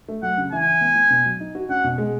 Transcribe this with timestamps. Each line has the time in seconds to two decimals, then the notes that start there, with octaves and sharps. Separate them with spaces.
0.09 A3
0.22 F#3 F#5
0.38 C#3
0.52 E3 G#5
0.66 E4
0.81 B3
0.95 B3
1.10 B2
1.26 F#3
1.40 D#4
1.55 F#4
1.69 C#4 F#5
1.84 B2
1.98 G#3